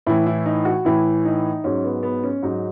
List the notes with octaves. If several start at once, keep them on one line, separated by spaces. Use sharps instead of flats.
A2 E3 E4
E4
D#4
F#4
A2 E3 E4
D#4
G#2 F#3 C#4
B3
B3
C#4
G#2 F#3 D#4